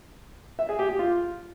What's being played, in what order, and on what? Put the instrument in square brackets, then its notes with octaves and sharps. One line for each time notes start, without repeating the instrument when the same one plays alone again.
[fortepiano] E5
G#4
G4
G4
F4